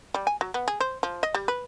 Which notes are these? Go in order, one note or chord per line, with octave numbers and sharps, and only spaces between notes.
G3
G#5
F#3
B3
G#4
C5
F3
D#5
G3
B4